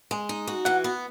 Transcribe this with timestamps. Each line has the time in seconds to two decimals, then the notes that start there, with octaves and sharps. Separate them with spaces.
0.11 G#3
0.29 D#4
0.47 F#4
0.65 E3 F#5
0.84 B3